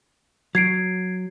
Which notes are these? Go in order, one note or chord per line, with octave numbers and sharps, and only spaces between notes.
F#3 G#6 C7 D7